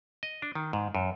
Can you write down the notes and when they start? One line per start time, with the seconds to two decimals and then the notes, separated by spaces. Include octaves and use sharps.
0.23 D#5
0.42 D4
0.55 D#3
0.73 G#2
0.95 F#2